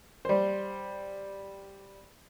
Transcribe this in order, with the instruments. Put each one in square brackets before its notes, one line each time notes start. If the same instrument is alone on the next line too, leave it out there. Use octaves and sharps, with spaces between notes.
[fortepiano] G3 C5